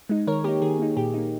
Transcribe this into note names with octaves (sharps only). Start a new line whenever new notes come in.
G#3 D#4
D#3 A#4 C#5
A#3 D#4 G4 A#4
D#3 G#4
A#3 D#4
A#2 G4
A#3 D#4